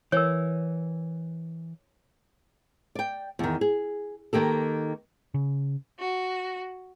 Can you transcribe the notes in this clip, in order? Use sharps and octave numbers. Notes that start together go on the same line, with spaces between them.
E3 A#4 C#5
D5 G5
E2 D#3
G#4
D#3 A#3 G4 A4
C#3
F#4